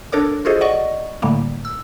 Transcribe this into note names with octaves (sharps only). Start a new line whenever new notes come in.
D4 A4 A#4 C#5 D6
F4 F#4 G#4 A4 C5 D#5
D5 D#5 F#5 C#6
A2 D3 G3 A3 A#3
E6